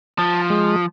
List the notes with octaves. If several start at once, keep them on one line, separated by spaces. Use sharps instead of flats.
F3 A5
G#3